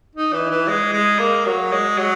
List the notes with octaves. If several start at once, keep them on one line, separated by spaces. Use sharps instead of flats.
D#4
E3
E3
G#3
G#3
A#3
F#3
G#3
F#3